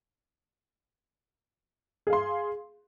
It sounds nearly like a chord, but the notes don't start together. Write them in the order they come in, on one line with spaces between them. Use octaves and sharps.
G#4 F5 C6